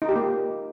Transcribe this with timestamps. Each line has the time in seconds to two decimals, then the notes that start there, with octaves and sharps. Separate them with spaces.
0.02 D#4
0.09 G4
0.16 A#3